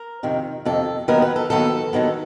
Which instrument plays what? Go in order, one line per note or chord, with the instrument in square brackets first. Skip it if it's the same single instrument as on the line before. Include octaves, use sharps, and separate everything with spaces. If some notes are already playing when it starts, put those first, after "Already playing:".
Already playing: [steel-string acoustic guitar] A#4
F2 C3 D#3
F2 C3 D#3 A4
D#2 D#3 F#3 B3 A#4
B4
A4
D#2 D#3 F#3 B3 A4
D#2 D#3 F#3 B3